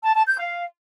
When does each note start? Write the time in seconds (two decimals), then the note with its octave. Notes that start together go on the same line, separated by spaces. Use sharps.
0.02 A5
0.14 A5
0.26 G6
0.37 F5